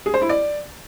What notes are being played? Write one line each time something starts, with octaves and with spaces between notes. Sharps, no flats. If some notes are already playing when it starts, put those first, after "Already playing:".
G#4
C5
E4
D5